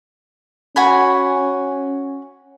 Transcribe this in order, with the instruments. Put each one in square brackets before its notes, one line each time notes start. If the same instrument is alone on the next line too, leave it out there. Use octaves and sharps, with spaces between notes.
[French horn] C#4 [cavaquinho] F#4 G#5 B5